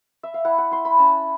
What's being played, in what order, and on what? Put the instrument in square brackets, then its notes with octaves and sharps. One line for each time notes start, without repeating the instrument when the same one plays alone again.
[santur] E5
F5
E4 F#5
F#5
E4 C6
B5
C#4 A5